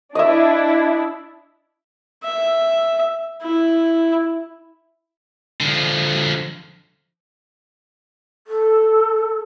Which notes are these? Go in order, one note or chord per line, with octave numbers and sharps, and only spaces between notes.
D4 E4 D#5 E5
E5
E4
D3 F3
A4